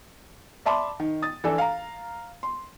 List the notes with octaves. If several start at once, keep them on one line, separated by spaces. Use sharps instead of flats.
D5 E5 A5 B5 C6 D6
D#3
D#6 A6
E3 D4 A4
F5 A#5
C6